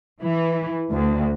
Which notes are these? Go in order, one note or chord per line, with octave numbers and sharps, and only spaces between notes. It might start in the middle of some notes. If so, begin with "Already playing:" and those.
E3
D2